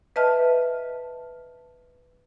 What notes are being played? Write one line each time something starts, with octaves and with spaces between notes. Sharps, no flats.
B4 D#5 E5 A5 F6